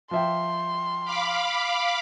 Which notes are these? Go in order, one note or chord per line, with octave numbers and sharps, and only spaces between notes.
F3 E5 G5 C6
F5 B5 D6